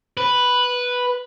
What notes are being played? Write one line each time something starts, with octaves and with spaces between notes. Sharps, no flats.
B4